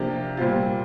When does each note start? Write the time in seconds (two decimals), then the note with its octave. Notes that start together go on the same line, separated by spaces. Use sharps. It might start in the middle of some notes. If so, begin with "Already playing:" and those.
Already playing: C3 F3 A#3 D4 G4
0.37 A#2 G3 C4 F4